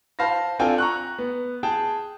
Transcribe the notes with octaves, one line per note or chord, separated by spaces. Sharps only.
C5 F5 A5 B5 A#6
C4 D4 F4 A4 G5 G#5
A#5 C#6 F#6
B3
G#4 G5 A5